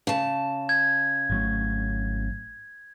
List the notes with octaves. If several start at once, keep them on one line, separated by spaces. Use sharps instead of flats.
C#3 A5
G#6
G#1 F#3 A3